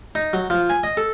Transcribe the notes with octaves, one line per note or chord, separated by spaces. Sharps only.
D#4
F#3
F3
G#5
D#5
A4